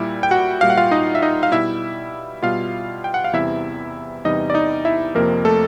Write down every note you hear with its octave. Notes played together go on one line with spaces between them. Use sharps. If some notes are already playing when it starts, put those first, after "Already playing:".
Already playing: A#2 G3 E4
G5
F#4 F#5
A#2 G3 F5
F#5
F4 F5
D#4 D#5
E5
D#4 D#5
F5
B2 G3 E4 E5
B2 G3 F4 F5
G5
F#5
F5
E2 C3 E3 G3 E4 E5
E2 C3 E3 G3 D#4 D#5
D5
D#4 D#5
E4 E5
F2 C3 F3 A#3 A#4
A3 A4